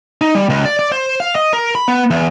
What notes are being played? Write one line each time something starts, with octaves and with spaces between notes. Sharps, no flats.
D#4
G3
C#2
D5
D5
C5
F5
D#5
A#4
B5
B3
E2